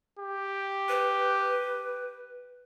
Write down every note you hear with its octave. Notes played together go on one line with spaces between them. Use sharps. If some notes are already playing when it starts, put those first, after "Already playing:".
G4
B4